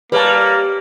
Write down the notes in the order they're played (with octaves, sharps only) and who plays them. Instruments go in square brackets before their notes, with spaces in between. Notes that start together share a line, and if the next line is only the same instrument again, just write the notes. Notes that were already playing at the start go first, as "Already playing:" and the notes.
[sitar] G3 [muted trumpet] A#3 [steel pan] B4 C#5 A5